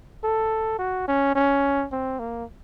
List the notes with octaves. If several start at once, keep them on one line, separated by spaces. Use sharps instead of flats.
A4
F#4
C#4
C#4
C4
A#3